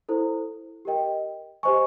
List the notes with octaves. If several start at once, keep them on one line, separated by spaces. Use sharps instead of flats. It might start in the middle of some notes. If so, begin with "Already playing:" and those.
E4 A4 C5
G4 A#4 D#5 G5
G4 C5 D#5 G#5 C#6